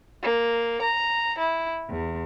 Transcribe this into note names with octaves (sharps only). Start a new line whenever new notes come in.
A#3
A#5
E4
E2